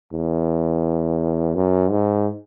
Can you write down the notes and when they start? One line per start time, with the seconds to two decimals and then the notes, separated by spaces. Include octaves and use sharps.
0.13 E2
1.55 F#2
1.91 G#2